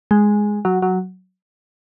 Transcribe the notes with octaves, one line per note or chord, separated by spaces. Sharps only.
G#3
F#3
F#3